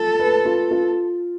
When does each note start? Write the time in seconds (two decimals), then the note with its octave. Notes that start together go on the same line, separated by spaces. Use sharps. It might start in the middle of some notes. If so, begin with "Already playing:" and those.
Already playing: F4 A4
0.19 B4
0.45 F4
0.71 F4